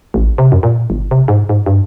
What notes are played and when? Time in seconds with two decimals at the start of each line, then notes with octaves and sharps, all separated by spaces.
0.14 A1
0.38 C3
0.52 F#2
0.63 A#2
0.90 G1
1.11 C3
1.28 G#2
1.49 G#2
1.66 G2